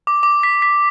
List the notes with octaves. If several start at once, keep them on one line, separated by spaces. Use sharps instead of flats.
D6
D6
B6
B6